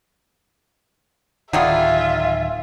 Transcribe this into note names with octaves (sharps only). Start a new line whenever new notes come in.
D1 D#3 F#3 G3 F4 G#4 E5